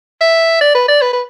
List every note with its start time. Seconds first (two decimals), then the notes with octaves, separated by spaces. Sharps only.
0.21 E5
0.61 D5
0.75 B4
0.89 D5
1.02 B4
1.13 B4